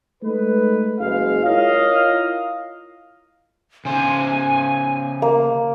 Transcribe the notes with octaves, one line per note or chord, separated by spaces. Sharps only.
G#3 A3 D#4 B4
F#1 G#3 F5
E4 F4 A#4 C#5 D#5 F5
C#3 C5 G#5
A#3